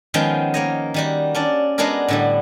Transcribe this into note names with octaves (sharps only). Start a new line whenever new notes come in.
D#3 F3 G#3 B3 C#4 G5
A#3 C#5 D#5
D#3 G3 F#4
C#4 D4 D5
G#3 B3 D4 F#4 G#4 A#4
A2 D3 G3